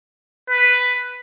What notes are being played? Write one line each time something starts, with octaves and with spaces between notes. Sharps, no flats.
B4